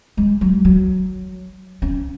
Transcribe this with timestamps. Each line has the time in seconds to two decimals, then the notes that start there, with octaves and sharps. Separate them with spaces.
0.17 G#3
0.41 F#3
0.65 F#3
1.82 C#4